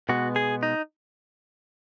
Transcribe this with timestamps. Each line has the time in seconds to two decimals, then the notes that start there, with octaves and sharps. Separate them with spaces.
0.09 B2 G#3 B3 F#4
0.36 G#4
0.63 D#4